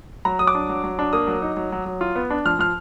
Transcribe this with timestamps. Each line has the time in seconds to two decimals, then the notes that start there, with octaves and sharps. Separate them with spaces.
0.25 F#3 A#5
0.39 F#3 D#6
0.47 D6
0.55 D4
0.69 F#3
0.84 F#3
0.99 D4
1.13 A#3 D#6
1.27 F#3
1.42 D#4
1.57 F#3
1.72 F#3
1.86 F#3
2.01 F4
2.15 B3
2.30 D4
2.46 F3 F6
2.59 F3 F6